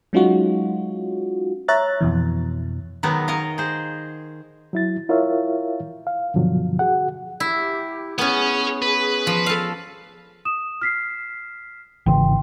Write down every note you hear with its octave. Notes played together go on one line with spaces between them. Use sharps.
F#3 G#3 C#4 D#4 F4 F#4
C#5 E5 A#5 F#6 A6
F2 B2 E3
D#3 F#3 G#3 B3 D#4
A#4 C#5 D#5 F5
G#4 C5
F#3 E4 A6
E4 F4 A#4 C#5 E5 F5
F5
G2 B2 D3 F3 F#3
F#4 G#4 F#5
E4 G4
B3 C#4 G#4 C#5 G#5
B4
F3
A4 F5
D#6 E7
F6 B6 C7
G#1 C#3 E3 G5 C6